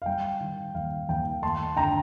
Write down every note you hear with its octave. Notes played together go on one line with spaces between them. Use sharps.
F5
G3 G5
D#3
D#2 F5
D#2 G5
A3 A5 C6
D3 G5 A#5